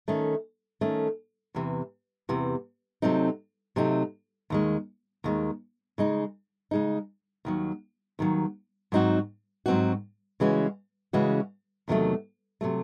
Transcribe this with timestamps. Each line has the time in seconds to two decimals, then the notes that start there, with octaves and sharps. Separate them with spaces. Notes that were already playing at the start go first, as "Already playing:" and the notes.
0.08 D#3 A3 C#4
0.81 D#3 A3 C#4
1.55 E2 C3 E3
2.29 E2 C3 E3
3.02 C3 F#3 A3 C4 D#4
3.76 C3 F#3 A3 C4 D#4
4.50 D#2 D#3 G#3
5.24 D#2 D#3 G#3
5.98 C#3 G#3 D#4
6.71 C#3 G#3 D#4
7.45 D#2 D#3 F#3
8.19 D#2 D#3 F#3
8.92 G#2 F#3 C4 D#4 F#4
9.66 G#2 F#3 C4 D#4 F#4
10.40 C#3 E3 G#3 C#4 F#4
11.13 C#3 E3 G#3 C#4 F#4
11.88 E2 C3 D#3 F#3 A3
12.61 C3 D#3 F#3 A3